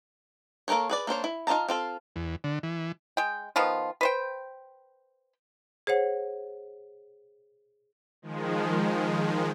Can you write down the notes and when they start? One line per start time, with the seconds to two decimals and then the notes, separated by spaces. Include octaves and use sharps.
0.68 A#3 A4 A#4 C5 C#5
0.90 G#4 B4 D5
1.07 A#3 D4 C5 C#5
1.24 E4
1.47 D#4 F4 D#5 A5 A#5
1.69 C4 F4 A4
2.16 E2
2.44 D3
2.63 E3
3.17 G#3 G5
3.56 D#3 F3 B3 F4
4.01 B4 C5 G5
5.87 G#4 C5 C#5 F#5
8.22 D#3 F3 G#3